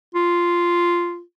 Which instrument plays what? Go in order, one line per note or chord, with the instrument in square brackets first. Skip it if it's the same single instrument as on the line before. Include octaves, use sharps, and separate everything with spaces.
[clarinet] F4